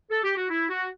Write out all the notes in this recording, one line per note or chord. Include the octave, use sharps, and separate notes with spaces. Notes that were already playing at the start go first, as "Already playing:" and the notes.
A4
G4
F#4
E4
F#4